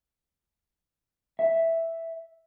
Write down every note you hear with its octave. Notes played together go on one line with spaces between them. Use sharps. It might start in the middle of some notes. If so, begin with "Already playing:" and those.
E5